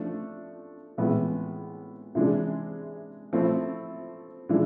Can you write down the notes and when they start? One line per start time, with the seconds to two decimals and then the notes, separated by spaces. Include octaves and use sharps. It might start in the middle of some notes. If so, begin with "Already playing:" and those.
Already playing: F3 A3 D4
0.98 A2 E3 G#3 B3
2.15 C3 E3 G#3 D4
3.33 F3 A3 C4 E4
4.49 E3 G#3 D4